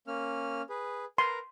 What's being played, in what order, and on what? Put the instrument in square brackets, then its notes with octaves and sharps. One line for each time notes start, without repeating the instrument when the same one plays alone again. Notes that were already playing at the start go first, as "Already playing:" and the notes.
[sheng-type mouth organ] A#3 C#4 F6
G#4 B4
[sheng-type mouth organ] A#4 B4 A#5 [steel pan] C6